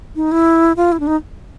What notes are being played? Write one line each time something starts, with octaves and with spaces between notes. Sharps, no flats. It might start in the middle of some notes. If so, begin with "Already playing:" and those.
D#4
E4
F4
E4
D4
D#4